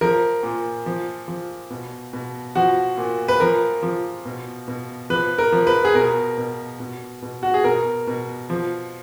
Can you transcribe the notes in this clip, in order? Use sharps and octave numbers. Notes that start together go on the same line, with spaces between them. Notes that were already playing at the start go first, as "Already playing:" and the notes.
F3 A#4
A#2
F3
F3
B2
B2
F3 F#4
A#2
B4
F3 A#4
F3
B2
B2
F3 B4
A#4
F3
B4
G#4
B2 A#4
B2
B2
B2
F#4
G#4
B2 A#4
B2
F3